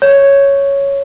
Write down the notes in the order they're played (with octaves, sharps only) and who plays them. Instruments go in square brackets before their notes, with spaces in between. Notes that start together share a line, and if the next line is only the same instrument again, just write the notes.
[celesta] C#5